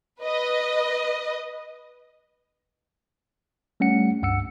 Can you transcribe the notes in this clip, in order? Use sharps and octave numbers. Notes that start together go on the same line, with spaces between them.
B4 D#5
G3 A3 C#4 F#5 C#7
C#2 G2 F#5 E6 C#7